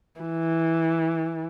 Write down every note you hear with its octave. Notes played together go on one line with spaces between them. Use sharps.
E3